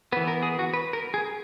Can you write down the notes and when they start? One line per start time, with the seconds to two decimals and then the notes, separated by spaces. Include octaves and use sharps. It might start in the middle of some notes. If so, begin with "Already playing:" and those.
0.12 B3 B4
0.17 E3
0.28 A#4
0.43 G#4
0.59 F#4
0.74 B4
0.93 A#4
1.14 G#4